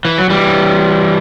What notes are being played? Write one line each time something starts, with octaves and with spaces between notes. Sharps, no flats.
E3
F#3
E3 G3